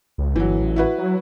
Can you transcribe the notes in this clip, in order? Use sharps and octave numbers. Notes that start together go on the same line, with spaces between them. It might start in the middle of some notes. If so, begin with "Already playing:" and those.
C#2
G1 E3 F#3
A1
E4 F#4 B4
F#3